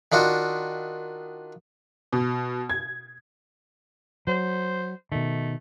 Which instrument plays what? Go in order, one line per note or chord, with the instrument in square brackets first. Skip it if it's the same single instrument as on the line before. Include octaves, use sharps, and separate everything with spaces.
[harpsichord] D#3 D4 F4 F#4
[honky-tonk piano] B2
G#6
[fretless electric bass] F#3 [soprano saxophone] C5
[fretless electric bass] B2 D#3 [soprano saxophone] A3